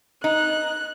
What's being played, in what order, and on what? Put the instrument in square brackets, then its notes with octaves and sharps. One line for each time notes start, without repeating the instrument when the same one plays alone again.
[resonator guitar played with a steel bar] D#4 [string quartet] F#6